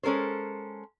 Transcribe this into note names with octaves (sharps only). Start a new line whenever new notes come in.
G#3 C#4 A4 A#4 C5